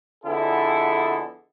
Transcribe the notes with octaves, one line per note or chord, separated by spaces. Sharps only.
F2 D3 B3 E4 G#4 A4